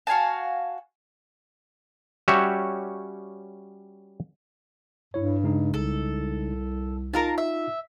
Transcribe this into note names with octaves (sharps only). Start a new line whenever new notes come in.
F#4 F5 G#5 A5
G3 C#4 F#4 G4 C#5 E5
G2 E4 C#5
C#3 G#3 D#4
C2 A4
D#4 F4 A#4 F5 A5
E5